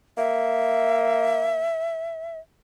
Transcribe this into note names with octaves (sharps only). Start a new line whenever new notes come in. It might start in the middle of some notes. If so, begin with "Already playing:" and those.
A#3 E5